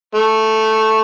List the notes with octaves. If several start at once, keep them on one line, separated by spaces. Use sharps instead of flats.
A3